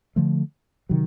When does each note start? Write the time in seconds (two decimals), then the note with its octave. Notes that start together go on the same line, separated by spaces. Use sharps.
0.16 D3 F3 A3
0.89 C3 D#3 F#3